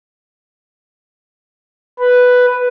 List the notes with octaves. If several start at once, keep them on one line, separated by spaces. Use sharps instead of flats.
B4